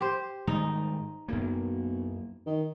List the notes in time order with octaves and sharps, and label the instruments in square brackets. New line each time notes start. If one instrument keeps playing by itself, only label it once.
[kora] G4 C5
[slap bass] G#2 D#3 G3 [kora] D#4
[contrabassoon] B1 [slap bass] F#2 A#3
[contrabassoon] D#3